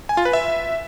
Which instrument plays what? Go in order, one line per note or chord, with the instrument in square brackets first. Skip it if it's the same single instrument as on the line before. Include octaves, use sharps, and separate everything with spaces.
[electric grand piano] G#5
F4
B4
E5